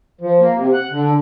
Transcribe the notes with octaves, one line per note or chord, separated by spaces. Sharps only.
F3
A#3
C3
F#5
D3